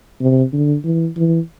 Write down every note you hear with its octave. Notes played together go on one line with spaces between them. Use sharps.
C3
D3
E3
E3